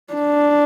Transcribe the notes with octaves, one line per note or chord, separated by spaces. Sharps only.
D4